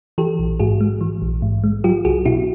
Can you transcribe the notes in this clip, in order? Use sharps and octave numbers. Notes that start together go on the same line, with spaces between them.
E3 G4 A4
A#1
G#2 F#4 G#4
G#3
E3
A#1
G#2
G#3
F#3 F4 G4
C2 F#4 G#4
B2 E4 F#4